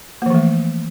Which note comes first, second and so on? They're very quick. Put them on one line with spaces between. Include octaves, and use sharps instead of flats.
A#3 F3 E3 A3